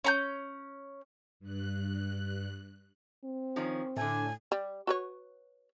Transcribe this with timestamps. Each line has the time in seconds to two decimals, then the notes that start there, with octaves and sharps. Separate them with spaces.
0.04 C#4 A#5 G6
1.40 G2 F#6
3.24 C4
3.56 D#3 F3 C#4
3.96 A2 D3 A3 G#5
4.52 G3
4.87 F#4 B4 C#5